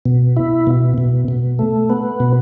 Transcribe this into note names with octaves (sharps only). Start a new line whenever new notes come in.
B2
E4
B2
B2
B2
A3
B3
B2